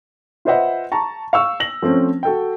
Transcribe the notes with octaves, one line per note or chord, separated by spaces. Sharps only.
F4 B4 C5 D#5 E5 F#5
A5 A#5 C#6
F5 C#6 E6
A#6 F#7
F3 A3 C4 C#4
F#4 A4 G5